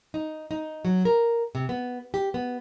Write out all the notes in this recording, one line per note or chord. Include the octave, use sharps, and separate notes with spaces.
D#4
D#4
F#3
A#4
C3
B3
G4
B3